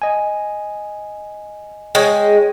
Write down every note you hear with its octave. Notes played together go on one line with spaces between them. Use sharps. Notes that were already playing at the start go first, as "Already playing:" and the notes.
D#5 G#5
G#3 C#5 G5